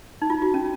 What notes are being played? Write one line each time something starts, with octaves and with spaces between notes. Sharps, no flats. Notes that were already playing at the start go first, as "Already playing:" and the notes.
D#4
F4
F#4
C#4